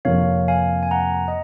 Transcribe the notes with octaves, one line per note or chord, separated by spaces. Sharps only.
F2 C3 F3 A#3 C#5 F5
F5 G#5
G#5
F#5 A#5
D#5